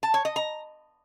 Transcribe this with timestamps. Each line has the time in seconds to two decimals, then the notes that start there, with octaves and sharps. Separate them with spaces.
0.03 A5
0.14 C#5
0.25 D#5
0.36 A#5